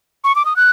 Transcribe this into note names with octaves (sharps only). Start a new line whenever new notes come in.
C#6
D6
D#6
F#6